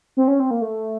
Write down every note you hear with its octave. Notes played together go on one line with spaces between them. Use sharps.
C4
C#4
C4
A#3
A3